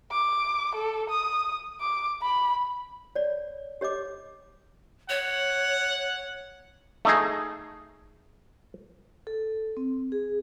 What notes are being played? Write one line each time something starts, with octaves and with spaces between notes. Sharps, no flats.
D6
A4
D#6
D6
B5
C#5 D5
G4 C#5 D#5 D6
C#5 F#5
A3 D#4 G#4
A4
C4
G#4